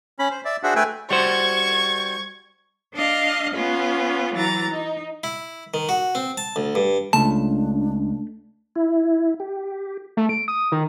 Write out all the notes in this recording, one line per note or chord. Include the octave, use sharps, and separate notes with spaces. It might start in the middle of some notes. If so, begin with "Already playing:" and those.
C#4 B5
C5
D5 E5
D4 F#4 G#4 C5 E5 F#5
A3 B4 E5 G5 G#5
G3 F#4 C5 C#6 G#6
D4 D#5 F5
B3 C#4 F4
E3 F#3 A#5 A6
D#4
E4
D#3
F#4
C4
A5
D2
G2
C#2 A3 D4 A5
E4
G4
A3
D7
D#6
D#3